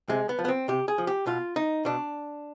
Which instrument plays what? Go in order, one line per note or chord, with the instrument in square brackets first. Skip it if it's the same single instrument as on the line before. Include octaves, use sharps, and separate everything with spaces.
[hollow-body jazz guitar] C3 G#3
B3
F3
B3
C4
C3 G4
G#4
F3
G4
B2 F4
D#4
B2 D4